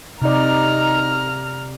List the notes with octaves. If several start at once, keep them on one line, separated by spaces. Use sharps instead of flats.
C3 D#4 D5 A#5 F6